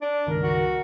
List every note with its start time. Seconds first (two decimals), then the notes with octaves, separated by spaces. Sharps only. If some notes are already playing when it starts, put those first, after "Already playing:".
0.02 D4
0.27 C#2 G2 D#3 A#4
0.43 F#4